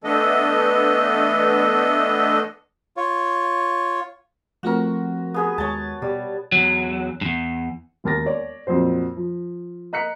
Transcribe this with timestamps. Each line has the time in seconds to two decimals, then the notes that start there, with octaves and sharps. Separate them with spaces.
0.04 E3 A3 B3 D4 A4 D#5
2.97 F4 C#5
4.63 F3 A3 C4 F#4 A#4
5.34 B3 G#4 B4
5.58 D#2 G#3 C#5 A5
6.02 B2 G3
6.52 E2 F#3
7.21 E2 G2
8.04 E1 D#2 A#4 A6 A#6
8.26 C#5 D5
8.67 F2 A#2 F#3 C5
9.17 F3
9.93 D#5 A#5 F#6 B6 C#7